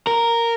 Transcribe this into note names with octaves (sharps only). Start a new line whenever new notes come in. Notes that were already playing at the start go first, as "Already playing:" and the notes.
A#4